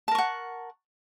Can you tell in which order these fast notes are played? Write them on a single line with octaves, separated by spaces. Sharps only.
A5 A#4 C#6 F#5